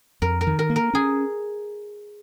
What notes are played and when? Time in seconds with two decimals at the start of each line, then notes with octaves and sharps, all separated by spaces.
0.22 F2 A#4
0.41 A#4
0.47 D#3
0.59 A#4
0.70 A#3
0.76 A#4
0.94 C#4 G#4